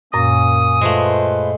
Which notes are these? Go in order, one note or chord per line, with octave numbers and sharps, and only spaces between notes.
F#2 A#2 A#3 C#4 D#6 A#6
G#3 A3 F4 B4 C5